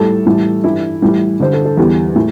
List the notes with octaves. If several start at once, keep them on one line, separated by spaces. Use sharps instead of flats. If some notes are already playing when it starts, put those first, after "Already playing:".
Already playing: A2 G3 A4
A2 E3 G3
G2 E3 G3 E4
A2 E3 G3
G2 D3 G3 C5
A4
A4
E2 E3 G3 G4
A2